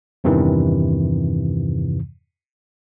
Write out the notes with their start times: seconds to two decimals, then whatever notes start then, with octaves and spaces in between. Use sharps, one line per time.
0.24 E2 G2 C3 D#3 E3